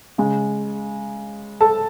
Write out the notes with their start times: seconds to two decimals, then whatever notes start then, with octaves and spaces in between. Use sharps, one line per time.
0.18 C#3 G#3
1.61 A4 A5